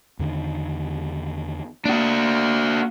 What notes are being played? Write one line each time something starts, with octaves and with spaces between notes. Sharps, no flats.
E2 D3 D#3
A#3 D4 F#4